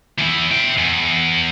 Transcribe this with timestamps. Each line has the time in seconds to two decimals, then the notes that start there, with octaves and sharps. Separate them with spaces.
0.18 E2 E4
0.51 E5 G5
0.78 E2